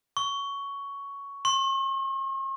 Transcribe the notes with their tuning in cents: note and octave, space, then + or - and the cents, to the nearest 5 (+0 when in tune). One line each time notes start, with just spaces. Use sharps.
C#6 +10
C#6 -45